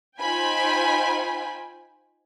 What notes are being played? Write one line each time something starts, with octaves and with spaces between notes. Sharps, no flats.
D#4 F4 C5 G5 G#5 B5